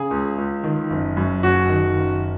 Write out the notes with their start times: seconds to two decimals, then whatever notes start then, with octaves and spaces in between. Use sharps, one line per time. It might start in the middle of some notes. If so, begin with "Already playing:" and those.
Already playing: C#3 G#4
0.11 C#2
0.38 C#2
0.64 D#3
0.90 F#1
1.17 F#2
1.43 F#1 F#4
1.69 D#3
1.95 F#1